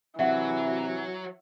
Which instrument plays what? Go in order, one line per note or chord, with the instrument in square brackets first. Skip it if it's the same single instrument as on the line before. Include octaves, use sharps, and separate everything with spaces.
[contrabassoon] C3 [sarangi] E3 [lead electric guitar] F#3 [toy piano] E5 F#5